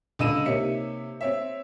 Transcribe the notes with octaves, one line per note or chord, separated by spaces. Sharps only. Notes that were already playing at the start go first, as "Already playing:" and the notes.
C#2 D3 D#5 E6 D#7 E7
C3 A#3 D#4 C#5 E5 C#7
C4 C#5 E5